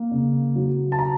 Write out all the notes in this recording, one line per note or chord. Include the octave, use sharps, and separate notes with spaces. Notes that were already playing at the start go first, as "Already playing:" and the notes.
Already playing: A#3
C#3
F#3
A5
A#5